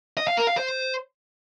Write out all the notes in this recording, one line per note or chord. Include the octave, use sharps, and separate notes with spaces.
D#5
F5
A#4
F5
C5